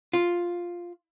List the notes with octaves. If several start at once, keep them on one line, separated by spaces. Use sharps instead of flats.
F4